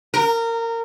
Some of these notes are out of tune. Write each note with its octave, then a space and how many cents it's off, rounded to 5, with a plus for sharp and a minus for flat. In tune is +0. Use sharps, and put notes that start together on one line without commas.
A#4 -20